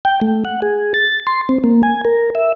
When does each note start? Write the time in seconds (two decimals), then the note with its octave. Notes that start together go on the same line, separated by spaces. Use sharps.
0.05 G5
0.21 A3
0.45 F#5
0.62 G#4
0.94 A6
1.27 C6
1.49 C4
1.64 A#3
1.83 G#5
2.05 A#4
2.35 E5